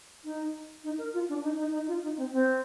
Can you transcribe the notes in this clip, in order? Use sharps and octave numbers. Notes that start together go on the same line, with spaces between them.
D#4
D#4
A#4
F4
D4
D#4
D#4
D#4
F4
D#4
C4
C4